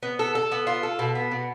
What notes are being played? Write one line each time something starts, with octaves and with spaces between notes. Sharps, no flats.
B3
A4
A4
B3
F4
A4
B2
B3
B2